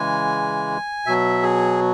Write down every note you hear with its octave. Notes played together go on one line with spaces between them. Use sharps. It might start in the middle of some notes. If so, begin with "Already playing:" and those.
Already playing: C#3 E3 G#3 G#5
B2 F#3 E5
G#4